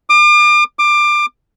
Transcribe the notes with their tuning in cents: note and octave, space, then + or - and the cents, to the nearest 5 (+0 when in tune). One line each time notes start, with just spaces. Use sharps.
D6 +40
D6 +25